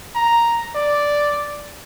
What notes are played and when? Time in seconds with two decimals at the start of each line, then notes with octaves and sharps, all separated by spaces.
0.15 A#5
0.75 D5